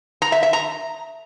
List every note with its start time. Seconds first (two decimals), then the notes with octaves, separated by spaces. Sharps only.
0.22 A#5
0.32 E5
0.43 E5
0.53 A#5